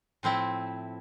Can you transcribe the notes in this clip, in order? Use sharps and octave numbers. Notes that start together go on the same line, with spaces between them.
A2 F3 C4 E4